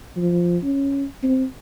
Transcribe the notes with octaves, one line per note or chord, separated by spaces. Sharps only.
F3
C#4
C4